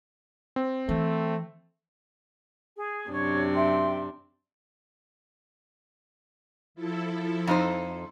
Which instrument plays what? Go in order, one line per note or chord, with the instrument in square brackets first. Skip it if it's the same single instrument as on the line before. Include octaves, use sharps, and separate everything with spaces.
[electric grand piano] C4
[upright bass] E3 [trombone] A3
[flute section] G#4
[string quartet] F#2 C3 D4 [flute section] C#5
[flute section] E5 G5 C6
[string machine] F3 E4 A4
[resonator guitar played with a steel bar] F2 D#4 C5